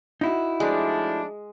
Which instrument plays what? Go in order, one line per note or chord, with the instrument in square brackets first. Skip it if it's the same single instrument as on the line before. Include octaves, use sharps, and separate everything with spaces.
[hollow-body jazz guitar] D#4 E4 F#4
[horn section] F3 A3 D4 [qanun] G#3